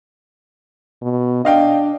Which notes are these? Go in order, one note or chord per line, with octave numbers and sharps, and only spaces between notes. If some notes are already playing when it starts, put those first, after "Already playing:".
B2
D4 D#5 F5 G5